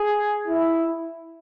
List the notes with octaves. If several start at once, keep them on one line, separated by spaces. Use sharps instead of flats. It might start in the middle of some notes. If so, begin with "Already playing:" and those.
Already playing: G#4
E4